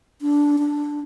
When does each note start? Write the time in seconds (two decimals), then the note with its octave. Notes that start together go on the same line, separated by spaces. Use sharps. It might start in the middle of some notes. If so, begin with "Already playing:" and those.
0.22 D4
0.59 D4